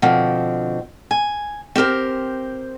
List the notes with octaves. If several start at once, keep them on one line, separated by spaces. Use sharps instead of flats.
B2 D3 F3 C4
G#5
C4 G4 A#4 C5